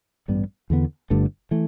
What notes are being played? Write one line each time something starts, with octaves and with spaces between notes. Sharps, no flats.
A1 G2 G3 B3
E2 D3 B3
G1 G2 D3 A3
E3 A3